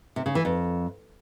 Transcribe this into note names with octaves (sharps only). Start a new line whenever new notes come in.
C3
C#3
E3
F2